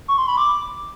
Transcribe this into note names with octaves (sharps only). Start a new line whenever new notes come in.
C#6
C6
B5
D6